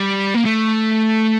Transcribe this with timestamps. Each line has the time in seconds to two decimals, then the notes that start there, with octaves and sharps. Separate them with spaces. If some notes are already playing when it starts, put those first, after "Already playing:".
Already playing: G3
0.34 A#3
0.45 A3